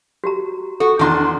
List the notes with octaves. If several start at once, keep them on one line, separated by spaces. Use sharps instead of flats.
F#4 G4 A#5
F#4 A4
E2 D#3 D4 C6